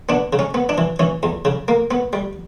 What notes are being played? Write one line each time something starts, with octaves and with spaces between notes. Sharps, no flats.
B3 D4
C#3
C#4
B3
D4
E3
E3 C#4
E2
C#3
A#3
B3
G3